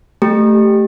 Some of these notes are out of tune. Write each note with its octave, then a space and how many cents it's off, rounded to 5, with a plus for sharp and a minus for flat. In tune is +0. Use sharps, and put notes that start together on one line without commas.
A3 +0 G4 +0